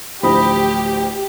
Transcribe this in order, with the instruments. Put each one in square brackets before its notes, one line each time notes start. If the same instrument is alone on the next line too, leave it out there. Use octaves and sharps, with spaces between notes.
[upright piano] A1 D2 F3 [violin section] G4 [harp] D#5 B5